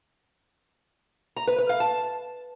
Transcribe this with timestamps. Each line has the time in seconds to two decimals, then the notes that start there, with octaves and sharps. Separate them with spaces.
1.36 A#5
1.47 B4
1.58 B4
1.69 F5
1.80 A5